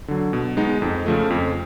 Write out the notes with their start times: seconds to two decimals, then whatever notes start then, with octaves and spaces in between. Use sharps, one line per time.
0.08 D3 F#3
0.33 B2
0.57 G#3 B3 D#4
0.82 F2
1.06 C#3 F3 A3
1.30 F2